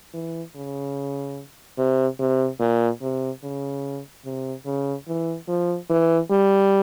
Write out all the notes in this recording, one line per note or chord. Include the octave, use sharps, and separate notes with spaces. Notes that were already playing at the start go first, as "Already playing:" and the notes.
E3
C#3
C3
C3
A#2
C3
C#3
C3
C#3
E3
F3
E3
G3